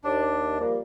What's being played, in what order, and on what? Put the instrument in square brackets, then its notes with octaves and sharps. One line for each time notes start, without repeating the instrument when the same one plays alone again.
[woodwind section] D#2 [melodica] D4
[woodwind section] F3 G3 A#3